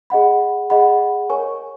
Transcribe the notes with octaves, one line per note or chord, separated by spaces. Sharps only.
G#4 D#5 F#5 B5
G#4 D#5 F#5 B5
A#4 C#5 G#5 C#6